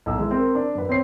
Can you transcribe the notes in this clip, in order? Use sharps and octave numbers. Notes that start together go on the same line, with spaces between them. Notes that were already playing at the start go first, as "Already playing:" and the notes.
B1 E6
E3 G#3
C4 A#4
D4
F#2 B4
C4 C5 C#5 C7